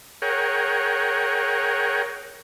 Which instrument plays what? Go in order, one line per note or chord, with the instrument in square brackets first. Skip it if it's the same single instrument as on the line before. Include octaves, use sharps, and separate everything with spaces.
[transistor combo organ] G#4 A#4 C#5 F#5 G5